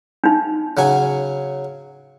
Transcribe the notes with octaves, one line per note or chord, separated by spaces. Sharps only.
D4 D#4
C#3 F#3 G#5